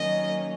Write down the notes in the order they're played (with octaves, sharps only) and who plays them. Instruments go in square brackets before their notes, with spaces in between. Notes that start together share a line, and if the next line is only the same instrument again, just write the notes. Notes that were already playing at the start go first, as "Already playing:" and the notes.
Already playing: [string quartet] D#3 F#3 A#3 C#4 D#5